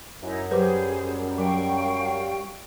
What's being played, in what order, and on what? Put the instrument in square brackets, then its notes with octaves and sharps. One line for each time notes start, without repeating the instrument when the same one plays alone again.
[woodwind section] F#2 [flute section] D#4 E4 C#5
[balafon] F#3 B4 [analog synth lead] G3 [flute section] G#4 C5
[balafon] F#3 [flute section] F5 G5 C#6